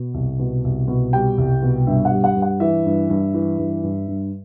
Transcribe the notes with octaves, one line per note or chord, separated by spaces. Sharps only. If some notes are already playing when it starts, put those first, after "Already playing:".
Already playing: B2
C2
B2
C2
B2
G3 G5
C2
B2
G2 E5
F#5
G3
F#5
G2
F#5
E3 E5
G2
G2
E3
G2
G2
G2